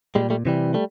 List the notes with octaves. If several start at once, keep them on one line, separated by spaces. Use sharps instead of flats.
A#2 G3 G#3
G3 A3
C3 E3 G3
G3 A3